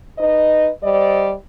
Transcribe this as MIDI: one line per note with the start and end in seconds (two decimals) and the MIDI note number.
0.19 0.69 63
0.19 0.69 71
0.19 0.69 75
0.83 1.33 55
0.83 1.33 72
0.83 1.33 74
0.83 1.33 75